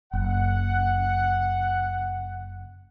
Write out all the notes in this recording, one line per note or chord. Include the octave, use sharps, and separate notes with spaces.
F#1 F#5